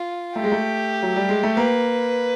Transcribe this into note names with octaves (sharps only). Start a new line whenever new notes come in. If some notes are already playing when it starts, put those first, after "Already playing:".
Already playing: F4
A3 G4
G#3
A3
F#3
G3
G#3
A3
A#3 B4